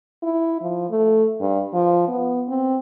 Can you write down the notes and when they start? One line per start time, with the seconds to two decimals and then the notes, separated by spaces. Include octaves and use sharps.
0.23 E4
0.61 F3
0.90 A3
1.41 G2
1.74 F3
2.08 B3
2.48 C4